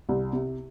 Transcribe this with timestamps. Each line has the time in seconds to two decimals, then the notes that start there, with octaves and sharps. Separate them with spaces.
0.09 C2
0.33 C3